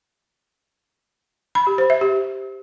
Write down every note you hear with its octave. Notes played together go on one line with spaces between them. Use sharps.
B5
G4
C5
E5
G4